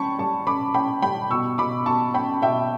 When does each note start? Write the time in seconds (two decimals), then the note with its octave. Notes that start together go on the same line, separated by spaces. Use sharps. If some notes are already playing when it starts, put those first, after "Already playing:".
Already playing: G3 C#4 G5 A5 B5 C#6
0.19 G3 A5 C#6
0.47 C#4 B5 D6
0.74 C#4 G5 B5
1.02 G3 G5 B5
1.30 B2 C#6 E6
1.58 B2 B5 D6
1.86 B2 A5 C#6
2.14 C#4 G5 B5
2.42 B2 E5 G5